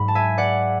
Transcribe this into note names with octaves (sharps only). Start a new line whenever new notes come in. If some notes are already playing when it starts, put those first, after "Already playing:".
Already playing: G#2 F#3 B5
A5
E5 G#5
D5 F#5